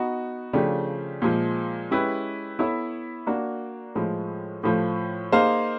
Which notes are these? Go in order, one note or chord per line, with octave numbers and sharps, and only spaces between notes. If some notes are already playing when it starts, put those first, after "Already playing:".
Already playing: B3 D#4 F#4
C#3 F3 A3 D4 G4
A#2 F3 G#3
G#3 C#4 E4 G4 B4
B3 E4 A4 C#5 E5
A#3 D4 F#4
A2 F3 G#3
A2 F3 A3
A#3 D#4 G#4 C5 F5